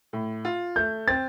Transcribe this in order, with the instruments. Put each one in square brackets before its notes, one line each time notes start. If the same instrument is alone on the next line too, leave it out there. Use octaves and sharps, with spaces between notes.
[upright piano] A2
F4
[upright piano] A3 [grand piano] G6
[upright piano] C4 [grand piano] A6